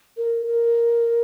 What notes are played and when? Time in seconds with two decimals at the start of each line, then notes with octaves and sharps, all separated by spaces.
0.17 A#4
0.46 A#4